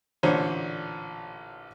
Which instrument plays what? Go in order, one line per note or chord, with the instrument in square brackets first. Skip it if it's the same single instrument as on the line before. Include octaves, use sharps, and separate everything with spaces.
[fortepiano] A1 A#2 D3 C5 C#5